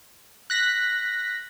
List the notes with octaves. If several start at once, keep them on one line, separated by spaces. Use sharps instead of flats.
F#6 A#6 B6